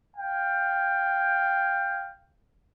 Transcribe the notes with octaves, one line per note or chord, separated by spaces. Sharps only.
F5 G5